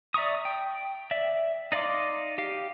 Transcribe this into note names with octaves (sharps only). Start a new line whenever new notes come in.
D5 E5 A#5 C#6 D#6
G5
D5 E5
D#4 D5 F5 C6 D6
G4 F5